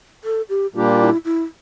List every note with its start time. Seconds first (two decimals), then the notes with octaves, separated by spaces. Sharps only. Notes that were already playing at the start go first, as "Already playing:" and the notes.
0.24 A4
0.49 G4
0.75 A#2 G3 A#3 D4 F4 G4
1.00 E4
1.25 E4